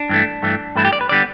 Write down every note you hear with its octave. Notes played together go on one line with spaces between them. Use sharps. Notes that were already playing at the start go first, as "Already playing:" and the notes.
Already playing: D4
G2 E3 A3
G2 E3 A3
G2 E3 A3 E4
G4
D5
B4
D3 G3 B3 D5